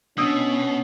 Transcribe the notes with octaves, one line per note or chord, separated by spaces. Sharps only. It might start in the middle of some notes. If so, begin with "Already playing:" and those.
B2 C#4 D4 D#6 E6